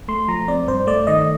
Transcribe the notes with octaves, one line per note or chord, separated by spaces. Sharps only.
A3 C6
F3 A#5
C4 D5
G2 C5
A3 D5
D#3 D#5